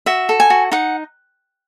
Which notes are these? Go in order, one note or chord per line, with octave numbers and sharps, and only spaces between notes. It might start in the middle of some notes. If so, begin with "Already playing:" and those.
F#4 E5
A4
G#5
F#4
D#4 F#5